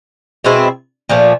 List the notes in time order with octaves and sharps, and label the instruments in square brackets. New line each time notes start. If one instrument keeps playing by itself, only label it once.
[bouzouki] B2 G#3 C4 E4
A#2 F3 A3